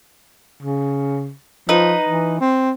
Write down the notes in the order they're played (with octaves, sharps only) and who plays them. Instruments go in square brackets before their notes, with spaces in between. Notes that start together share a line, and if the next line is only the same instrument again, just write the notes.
[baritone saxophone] C#3
[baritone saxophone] F3 [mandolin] D#4 B4
[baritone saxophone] E3
C4